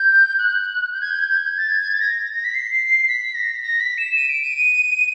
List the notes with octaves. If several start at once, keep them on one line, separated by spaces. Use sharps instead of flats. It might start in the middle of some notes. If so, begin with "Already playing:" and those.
Already playing: G6
F#6
G6
G#6
G6
G#6
G6
G#6
A6
G#6
A6
A#6
A#6
B6
C7
B6
A#6
A#6
B6
E7
D#7
D7
D#7